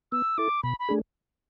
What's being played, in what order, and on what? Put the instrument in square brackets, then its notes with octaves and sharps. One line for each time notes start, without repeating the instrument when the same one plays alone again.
[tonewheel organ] B3 [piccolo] E6
[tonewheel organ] E4 A4 [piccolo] D6
[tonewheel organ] B2 [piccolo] B5
[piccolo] B5
[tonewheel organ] A3 D4 G#4